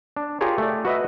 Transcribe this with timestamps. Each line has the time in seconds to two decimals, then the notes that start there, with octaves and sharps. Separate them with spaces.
0.17 D4
0.41 F4 G4 G#4 A#4 C#5
0.58 A3 D5
0.85 F#4 B4 D#5 E5